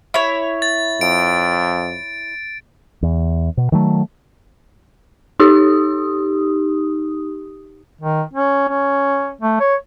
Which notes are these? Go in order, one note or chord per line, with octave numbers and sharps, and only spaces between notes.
E4 C#5
A6
F2 D7
E2
B2
D#3 F#3 A3
D#4 G4 D#6
D#3
C#4
C#4
A3
C#5